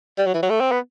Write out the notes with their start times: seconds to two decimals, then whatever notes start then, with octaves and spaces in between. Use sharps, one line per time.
0.18 G3
0.26 F#3
0.34 E3
0.43 F#3
0.50 A3
0.61 C4
0.72 B3